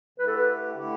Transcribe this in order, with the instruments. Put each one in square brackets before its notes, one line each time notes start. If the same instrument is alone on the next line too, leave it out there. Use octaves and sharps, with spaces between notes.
[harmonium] D3 A3 E4 G4 [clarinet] B4
[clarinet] A4
B4
[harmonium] D3 A3 E4 G4